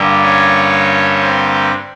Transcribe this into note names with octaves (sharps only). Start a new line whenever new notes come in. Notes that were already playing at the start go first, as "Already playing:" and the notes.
Already playing: G2 D3 G3 A#3
C#4 C#5
C4 C5